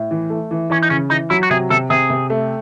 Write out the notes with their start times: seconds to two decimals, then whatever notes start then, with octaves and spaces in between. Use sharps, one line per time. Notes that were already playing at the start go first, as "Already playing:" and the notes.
Already playing: A2
0.11 E3
0.30 A3
0.51 E3
0.70 E3 C#4
0.82 D#4
0.90 C#3 C#4
1.10 E3 D#4
1.30 F#3 E4
1.43 F#4
1.50 C3 G#4
1.70 C3 A4
1.90 C3 G#4
2.10 C3
2.30 A3